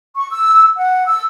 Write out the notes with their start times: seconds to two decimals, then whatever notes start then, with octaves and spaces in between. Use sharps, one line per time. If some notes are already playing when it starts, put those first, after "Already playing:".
0.15 C#6
0.32 E6
0.77 F#5
1.06 E6